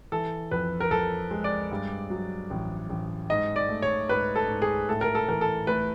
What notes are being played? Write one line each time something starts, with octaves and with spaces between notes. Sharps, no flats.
E3 A4
F2 B4
A#4
F2 A4
G#3
D5
G2
F#3
A1
A1
G#2 D#5
D5
A3
C#5
G#2 B4
A4
G#2
G#4
A2 A4
A#4
A4
E3 A#4
A4
A3 B4